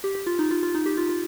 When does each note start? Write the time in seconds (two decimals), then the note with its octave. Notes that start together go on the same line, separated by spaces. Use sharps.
0.04 G4
0.15 G4
0.27 F4
0.39 D#4
0.51 F4
0.63 F4
0.75 D#4
0.86 G4
0.97 F4
1.09 F4